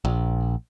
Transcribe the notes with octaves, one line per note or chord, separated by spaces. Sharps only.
A#1